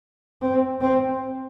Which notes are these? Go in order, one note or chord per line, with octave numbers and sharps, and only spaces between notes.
C4
C4